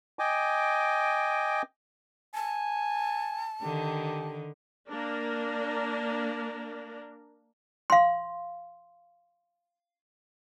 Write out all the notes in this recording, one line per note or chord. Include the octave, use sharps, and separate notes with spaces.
D#5 G5 G#5 D6
G#5 A5
D3 D#3 G4
A#3 D4 A#4
F5 C6